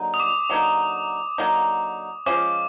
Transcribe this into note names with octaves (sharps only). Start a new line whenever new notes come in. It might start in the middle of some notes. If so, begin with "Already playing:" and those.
Already playing: D3 F#3 A#3 D#4
D#6
D6
D3 F#3 A#3 D#4
D3 F#3 A#3 D#4
F3 G#3 C#4 F4 D6